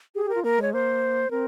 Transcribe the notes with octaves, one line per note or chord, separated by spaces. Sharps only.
G4 G#4
G4
A#4
F4
A#3 A#4
G#3 C#5
A#3 C5
C4 A#4